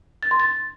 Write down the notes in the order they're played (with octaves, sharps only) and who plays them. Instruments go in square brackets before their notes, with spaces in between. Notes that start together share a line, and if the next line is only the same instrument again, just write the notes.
[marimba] A6
C6
A6